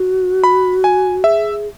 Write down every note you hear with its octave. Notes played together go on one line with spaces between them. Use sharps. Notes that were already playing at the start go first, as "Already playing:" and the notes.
Already playing: F#4
B5
G#5
G#4 E5